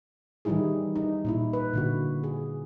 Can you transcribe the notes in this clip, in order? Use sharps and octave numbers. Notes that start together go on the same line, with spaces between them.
D#3 E3 G3 D#4 E4 G#4
D#4
A#2 D#4 E4
B4
A#2 D3 F#4
G#4